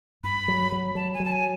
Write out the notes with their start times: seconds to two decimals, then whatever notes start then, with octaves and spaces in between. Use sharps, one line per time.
0.23 G2 B5
0.48 F#3
0.72 F#3
0.95 F#3 A5
1.14 G#5
1.20 F#3
1.25 A5
1.32 G#5